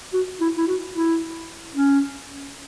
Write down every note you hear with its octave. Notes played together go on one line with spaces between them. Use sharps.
F#4
E4
E4
F#4
E4
C#4